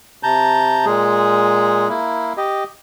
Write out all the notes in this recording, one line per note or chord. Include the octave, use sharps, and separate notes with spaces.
C3 A5 A#5 G6
A#2 G#3 G#4
A#3 E4
G4 D#5